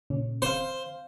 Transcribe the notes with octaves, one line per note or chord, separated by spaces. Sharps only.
A#2 C#3 C#4
C4 C5 F5